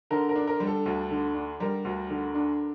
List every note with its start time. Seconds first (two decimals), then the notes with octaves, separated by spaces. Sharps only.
0.11 D3 A#4
0.29 A#4
0.35 D4
0.47 A#4
0.60 G3
0.67 A4
0.86 D2
1.11 D3
1.35 D4
1.60 G3 A#4
1.85 D2
2.10 D3
2.35 D4